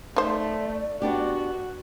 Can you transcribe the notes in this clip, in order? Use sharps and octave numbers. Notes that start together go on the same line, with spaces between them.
A3 D#4 C5 D5
B3 D4 F#4 G4